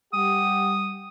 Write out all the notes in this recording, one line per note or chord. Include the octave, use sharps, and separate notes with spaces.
G3 G4 F#5 D#6